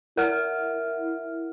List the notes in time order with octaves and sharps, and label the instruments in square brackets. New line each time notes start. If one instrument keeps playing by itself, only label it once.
[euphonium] E4 [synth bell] A#4 F#5 F6